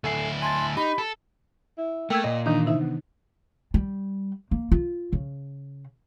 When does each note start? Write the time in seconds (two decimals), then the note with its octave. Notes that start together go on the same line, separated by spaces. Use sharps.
0.04 D2 E4 A4 G#5 C7
0.42 G#5 A5 C6 A6
0.77 D#4 G4 B5
0.98 A4
1.78 E4
2.10 A3 A#3 G5 E6 G#6
2.24 A#2 D#5
2.46 D#3 E3 D4 D#4
2.67 C3 D#4 E4
2.80 B3
3.74 G3
4.51 A#3
4.72 F4
5.13 C#3